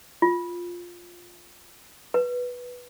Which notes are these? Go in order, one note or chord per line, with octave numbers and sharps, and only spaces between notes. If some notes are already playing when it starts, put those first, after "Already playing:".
F4
B4